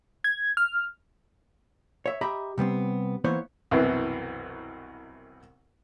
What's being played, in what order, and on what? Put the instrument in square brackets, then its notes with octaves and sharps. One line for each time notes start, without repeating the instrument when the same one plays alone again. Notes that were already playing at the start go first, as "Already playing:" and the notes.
[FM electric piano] G#6
F6
[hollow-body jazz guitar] C#5 E5
G4 D#5 E5 A#5 B5
C3 G3 B3 C4
E3 A#3 B3 E4 C5 C#5
[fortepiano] C2 F#2 B2 E3